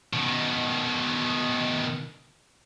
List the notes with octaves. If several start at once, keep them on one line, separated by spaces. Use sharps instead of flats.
B2 D#3